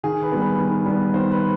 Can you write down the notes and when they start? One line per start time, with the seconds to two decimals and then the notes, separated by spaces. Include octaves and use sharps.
0.03 D#3 G#4
0.22 B4
0.32 G3 B3
0.41 B4
0.59 D#3
0.86 G3 B3
1.13 D#3 C5
1.32 B4